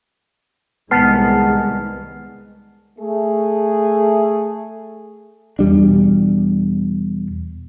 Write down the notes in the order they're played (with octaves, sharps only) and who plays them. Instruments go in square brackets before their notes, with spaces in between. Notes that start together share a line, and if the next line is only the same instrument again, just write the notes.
[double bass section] C2 D#3 G#3 [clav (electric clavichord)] B3 [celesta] A5 F6 C7
[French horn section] A3 G#4
[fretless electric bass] E2 B2 G3 D4